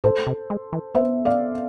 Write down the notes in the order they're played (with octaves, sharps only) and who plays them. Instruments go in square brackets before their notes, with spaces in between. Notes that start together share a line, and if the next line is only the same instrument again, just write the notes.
[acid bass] A2 [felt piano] A4 C5
[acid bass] C3
G#3
E3
[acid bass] B3 [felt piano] C5 E5
[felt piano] D5 F5